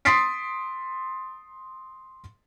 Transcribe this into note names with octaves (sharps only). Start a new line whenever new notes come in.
C6 D#6 A6 B6 C7 D7